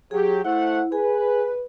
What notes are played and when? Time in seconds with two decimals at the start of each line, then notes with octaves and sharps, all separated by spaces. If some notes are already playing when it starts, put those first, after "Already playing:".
0.11 F#3 G4 G#4
0.45 A3 E4 C5 F#5
0.92 G#4 B4 G#5